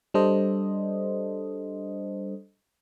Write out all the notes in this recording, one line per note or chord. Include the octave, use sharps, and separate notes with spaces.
G3 D4 A4 C5 D#5